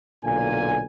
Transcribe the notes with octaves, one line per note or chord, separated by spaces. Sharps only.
B1 A#2 D3 G#5